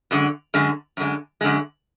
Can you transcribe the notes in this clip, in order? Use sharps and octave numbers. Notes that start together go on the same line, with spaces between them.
F#2 D3 G#3
F#2 D3 G#3
F#2 D3 G#3
F#2 D3 G#3